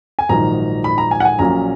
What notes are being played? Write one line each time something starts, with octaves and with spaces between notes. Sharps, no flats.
G#5
A#1 G#2 D#3 F#3 A#5
B5
A#5
G#5
F#5
G#5
A#1 A#2 F#3 C#4 A#5